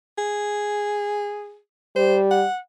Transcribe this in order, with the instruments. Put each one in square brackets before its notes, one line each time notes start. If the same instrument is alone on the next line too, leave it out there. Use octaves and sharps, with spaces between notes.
[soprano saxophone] G#4
[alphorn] G3 [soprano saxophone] C5
[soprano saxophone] F#5